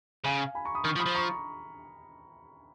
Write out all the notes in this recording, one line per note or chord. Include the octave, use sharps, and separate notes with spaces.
C#3 F5 G#5
G#5 B5
A#5 C#6
B5 D#6
D#3 C#6 F6
F3
B5 D#6
F3
A#5 C#6